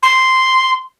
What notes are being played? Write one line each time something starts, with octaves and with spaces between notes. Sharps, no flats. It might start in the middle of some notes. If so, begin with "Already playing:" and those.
C6